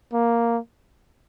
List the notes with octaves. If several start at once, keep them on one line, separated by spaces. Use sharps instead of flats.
A#3